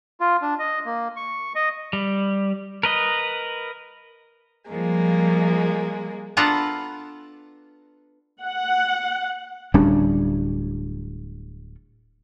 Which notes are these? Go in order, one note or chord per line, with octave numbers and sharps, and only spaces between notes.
F4
D4
D#5
A#3
C#6
D#5
G3
A#4 B4 D#5
F3 G3 G#3 A#3
B3 D4 F4 A4 F#5 A#5
F#5
D1 G3 C#4 D4